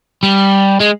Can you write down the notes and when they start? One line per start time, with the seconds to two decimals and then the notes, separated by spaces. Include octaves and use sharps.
0.23 G3
0.80 G#3